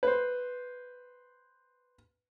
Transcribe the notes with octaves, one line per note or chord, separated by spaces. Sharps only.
B4 C5